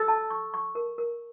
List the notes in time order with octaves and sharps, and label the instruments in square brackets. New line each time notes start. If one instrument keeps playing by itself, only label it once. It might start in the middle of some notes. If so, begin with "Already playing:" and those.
Already playing: [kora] A4
[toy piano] A5
C#6
C#6
A#4
A#4